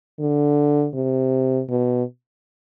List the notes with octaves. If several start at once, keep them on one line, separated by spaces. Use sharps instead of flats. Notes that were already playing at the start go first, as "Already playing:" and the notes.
D3
C3
B2